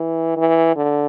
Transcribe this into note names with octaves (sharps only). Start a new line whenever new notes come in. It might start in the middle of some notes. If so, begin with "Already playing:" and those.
Already playing: E3
E3
D3